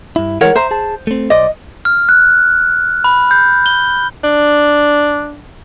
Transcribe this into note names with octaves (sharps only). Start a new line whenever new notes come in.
G2 E4
E3 G#3 A#4 C#5 F#5
C5 E5 A#5 C6
G#4 A5
A3 C4
B1 C5 D5 D#5
F6
F#6
B5
G6
G7
D4